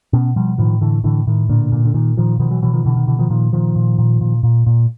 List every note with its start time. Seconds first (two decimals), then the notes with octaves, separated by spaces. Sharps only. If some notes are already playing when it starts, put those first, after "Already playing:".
0.13 B2 B3 C#4
0.36 B2 F3 G3
0.58 A2 D#3 F3
0.81 A2 D3 E3
1.04 A2 D3 E3
1.27 A2 D#3
1.49 A#2 D3
1.72 A#2
1.85 D3
1.94 A#2 D#3
2.17 A#2 D#3 F3
2.39 B2 D#3 F3
2.51 E3 F#3
2.62 B2 E3 F#3
2.73 D#3 F3
2.85 B2 D3 E3
2.97 D#3
3.07 B2 D3 E3
3.19 D#3 F3
3.30 A#2 D#3 F3
3.53 A#2 D#3 F3
3.76 A#2
3.98 A#2
4.21 A#2
4.43 A#2
4.66 A#2